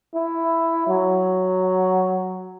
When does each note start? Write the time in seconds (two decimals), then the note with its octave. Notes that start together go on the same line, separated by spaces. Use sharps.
0.15 E4
0.87 F#3